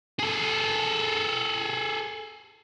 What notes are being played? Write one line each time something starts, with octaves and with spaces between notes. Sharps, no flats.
G#4 A4